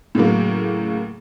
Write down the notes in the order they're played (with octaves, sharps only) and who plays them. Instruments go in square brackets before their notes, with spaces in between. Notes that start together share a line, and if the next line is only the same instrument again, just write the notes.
[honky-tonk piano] A2 C#3 F#3 A#3